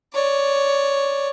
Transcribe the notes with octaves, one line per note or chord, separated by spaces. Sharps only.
C#5 D5